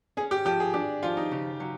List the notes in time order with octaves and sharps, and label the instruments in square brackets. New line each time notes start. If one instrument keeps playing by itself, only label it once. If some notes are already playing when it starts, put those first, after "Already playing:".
[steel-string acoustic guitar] C#4 [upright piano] G#4
[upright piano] G4
[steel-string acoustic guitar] F3 [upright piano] G4
[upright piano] G#4
[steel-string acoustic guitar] D4 [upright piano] G4
[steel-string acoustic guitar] F3 [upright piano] F4
[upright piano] D#4
[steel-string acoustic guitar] C#3
F#3